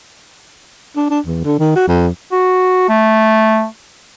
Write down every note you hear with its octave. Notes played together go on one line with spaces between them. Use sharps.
D4
D4
E2
D3
D#3
F#4
F2
F#4
A3